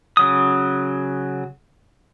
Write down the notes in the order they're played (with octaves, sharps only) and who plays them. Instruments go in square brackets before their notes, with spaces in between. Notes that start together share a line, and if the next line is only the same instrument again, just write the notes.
[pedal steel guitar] C#3 F#3 D#6